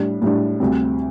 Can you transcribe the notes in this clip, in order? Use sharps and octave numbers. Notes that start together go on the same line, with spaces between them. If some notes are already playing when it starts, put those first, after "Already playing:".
Already playing: A2 G3 D4
A2 G3 D4
D2 C3 G3 C4